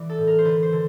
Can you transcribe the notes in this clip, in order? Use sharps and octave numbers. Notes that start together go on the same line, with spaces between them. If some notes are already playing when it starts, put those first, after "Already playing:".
Already playing: E3 D5
A4
A2
A#4
C5
D3 B4
C5
D3